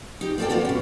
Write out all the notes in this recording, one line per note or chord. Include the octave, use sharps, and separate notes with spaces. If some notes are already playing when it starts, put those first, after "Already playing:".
D#4 G4
A#3 C4 A4 C#5 D5 G5
F#3 A#3 B3 F4 F#4
B2 C#4